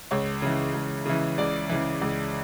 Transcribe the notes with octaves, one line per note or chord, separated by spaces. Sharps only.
C#2 C#5
C#3 E3
C#2
C#3 E3
C#2 D5
C#3 E3
C#2